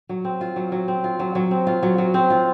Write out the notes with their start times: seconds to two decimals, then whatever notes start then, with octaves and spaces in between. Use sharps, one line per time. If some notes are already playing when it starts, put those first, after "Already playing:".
0.09 F#3
0.25 C4
0.41 F4
0.56 F#3
0.72 F#3
0.88 C4
1.04 F4
1.19 F#3
1.35 F#3
1.51 C4
1.67 F4
1.83 F#3
1.98 F#3
2.14 C4
2.30 F4